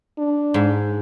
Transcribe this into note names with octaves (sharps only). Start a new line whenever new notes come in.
D4
G#2